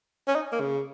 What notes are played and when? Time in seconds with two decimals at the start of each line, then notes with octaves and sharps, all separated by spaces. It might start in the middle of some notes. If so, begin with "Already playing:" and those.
0.28 C#4
0.35 D#4
0.52 A#3
0.60 C#3